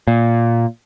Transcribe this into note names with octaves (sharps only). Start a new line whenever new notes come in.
A#2